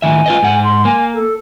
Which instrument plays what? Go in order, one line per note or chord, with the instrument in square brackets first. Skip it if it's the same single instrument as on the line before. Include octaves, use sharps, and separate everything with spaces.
[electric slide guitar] A2 D#3 E5 [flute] G#5
[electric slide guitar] F4 B4 D#5
G#2 F#5
[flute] C6
[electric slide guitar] A#3 [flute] G#5
[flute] A4